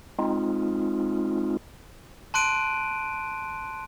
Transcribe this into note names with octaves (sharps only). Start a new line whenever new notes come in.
G#3 C4 D#4 F4
A5 C6 F#6 D7 D#7